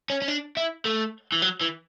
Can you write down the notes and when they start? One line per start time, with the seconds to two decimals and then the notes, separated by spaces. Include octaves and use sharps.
0.10 C#4
0.22 C#4
0.28 D4
0.57 E4
0.85 A3
1.32 E3
1.42 F#3
1.61 E3